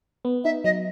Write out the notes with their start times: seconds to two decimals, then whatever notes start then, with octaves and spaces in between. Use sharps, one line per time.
0.25 B3
0.44 D#4 E5
0.64 F#3 D#5